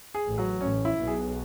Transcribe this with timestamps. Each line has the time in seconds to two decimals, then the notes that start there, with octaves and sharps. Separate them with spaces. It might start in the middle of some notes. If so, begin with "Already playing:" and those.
0.15 G#4
0.26 A1 A2
0.38 F#3
0.61 A1 A2 C#4
0.85 E4
0.96 B1 B2
1.07 G#4